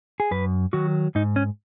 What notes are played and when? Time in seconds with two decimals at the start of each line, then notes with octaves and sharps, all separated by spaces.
0.20 G#4
0.31 F#2 B4
0.73 D#3 F#3 F#4
1.15 G#2 D#4
1.36 C#4